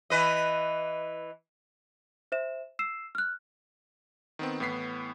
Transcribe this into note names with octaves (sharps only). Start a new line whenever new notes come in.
E3 B4 D#5
C5 E5 E7
E6 C7 E7
F6 F#6
D#3 B3 C4
A2 E3 B3 B6 C7